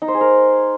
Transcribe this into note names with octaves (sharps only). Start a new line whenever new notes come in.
D#4
C5
G#4
A#4